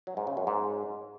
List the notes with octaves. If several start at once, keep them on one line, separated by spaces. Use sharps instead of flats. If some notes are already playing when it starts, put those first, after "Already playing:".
F#3
G#2
C#3
F#2
G#2